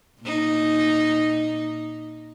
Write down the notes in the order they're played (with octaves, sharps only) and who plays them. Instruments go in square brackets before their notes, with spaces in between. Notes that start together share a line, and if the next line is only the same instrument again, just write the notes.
[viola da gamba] A#2 D#4